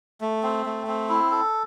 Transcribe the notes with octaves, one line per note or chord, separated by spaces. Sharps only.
A3
C4
A3
C4
E4
A4